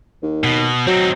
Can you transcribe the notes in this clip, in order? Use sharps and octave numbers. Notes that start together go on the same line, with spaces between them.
D#2
B2
F#3 C4 D#4